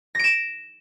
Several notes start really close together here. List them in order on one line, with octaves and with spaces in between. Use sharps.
A#6 D7 E7